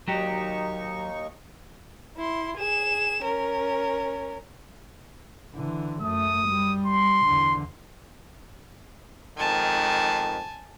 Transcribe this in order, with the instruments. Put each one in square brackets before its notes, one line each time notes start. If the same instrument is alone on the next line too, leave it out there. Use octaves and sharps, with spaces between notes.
[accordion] D#2 D#4 C#6 [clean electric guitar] F#3 G4
[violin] E4 C6
G#4 E7
C#4 A#4
[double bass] D3 E3
[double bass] F#2 A3 [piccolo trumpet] D#6
[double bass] G3
[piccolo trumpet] C6
[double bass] E2 D3
[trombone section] F2 G#2 D#3 [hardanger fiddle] G#5 A5